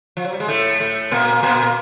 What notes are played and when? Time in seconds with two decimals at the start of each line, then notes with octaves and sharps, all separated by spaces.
0.17 F3
0.24 F#3
0.33 G3
0.40 G#3
0.48 A2 A3
0.80 A2 A3
1.12 A#2 A#3
1.43 A#2 A#3